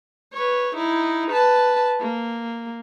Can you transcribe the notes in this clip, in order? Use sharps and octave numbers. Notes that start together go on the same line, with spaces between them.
B4 C#5
D#4 E4
B4 A5
A#3